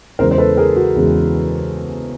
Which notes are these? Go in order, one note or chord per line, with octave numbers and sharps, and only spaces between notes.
E2 C#3 E3 G#3 A#4 C5
C5
A4 B4
G#4 A#4
F#4
E2 C#3 E3 G#3